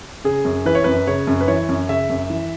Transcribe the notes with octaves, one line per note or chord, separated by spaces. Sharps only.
C#3 G#4
F#2
E3 B4
C#5
F#2 B4
C#3 C#5
F#2
B4
E3 C#5
F#2
C#3 E5
F#2
E3